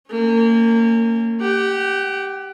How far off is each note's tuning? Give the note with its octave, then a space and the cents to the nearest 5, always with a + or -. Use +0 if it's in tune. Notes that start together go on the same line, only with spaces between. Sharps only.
A#3 -30 C#4 +0
G4 +0 F#5 +30